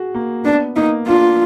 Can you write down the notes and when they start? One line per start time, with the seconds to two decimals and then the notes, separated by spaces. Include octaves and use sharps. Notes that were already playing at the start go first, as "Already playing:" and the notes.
Already playing: F#4 G#4
0.15 A#3
0.45 B3 D4
0.76 A#3 D#4
1.07 D4 F4